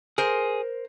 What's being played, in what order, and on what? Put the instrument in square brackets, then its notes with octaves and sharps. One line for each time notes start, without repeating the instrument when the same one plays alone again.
[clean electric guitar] G#4 [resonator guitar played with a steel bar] A#4 C5